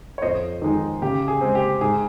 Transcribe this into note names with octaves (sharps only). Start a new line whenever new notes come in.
C#5
F2 C5 D#5
D#3 G#3 D#4
C#3 G4
G#4
G#3 C4
G4
G#2 G#4